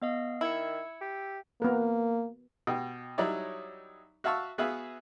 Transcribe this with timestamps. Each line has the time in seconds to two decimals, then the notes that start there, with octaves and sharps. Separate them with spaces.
0.02 B3 D#5 F5
0.41 D#3 E4 E6 G#6 C#7
1.01 G4
1.62 A#3 B3 A#4
2.67 B2 G4
3.18 F#3 G3 D#4 E4 C#5 D5
4.24 F#4 E5 F5 A5 C#6 E6
4.58 B3 F#4 G#4 B4 E5 F5